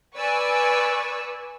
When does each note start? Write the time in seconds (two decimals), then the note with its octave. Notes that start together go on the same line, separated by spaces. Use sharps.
0.17 B4 D5 G#5 C#6 E6